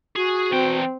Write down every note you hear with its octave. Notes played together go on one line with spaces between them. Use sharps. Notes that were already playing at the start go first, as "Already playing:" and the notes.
F#4 G#4
E2 C4 G5